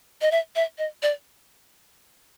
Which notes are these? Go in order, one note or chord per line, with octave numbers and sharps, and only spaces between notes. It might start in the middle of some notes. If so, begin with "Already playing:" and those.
D#5
E5
E5
D#5
D5